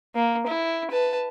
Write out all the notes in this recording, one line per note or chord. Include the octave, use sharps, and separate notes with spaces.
A#3
E4
B4 A5